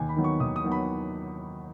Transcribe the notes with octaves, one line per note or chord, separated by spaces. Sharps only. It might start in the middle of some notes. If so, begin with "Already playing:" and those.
Already playing: D#2 G#5
B5
D#3 F#3 B3
C#6
D#2 D#6
D#6
D#3 F#3 B3
B5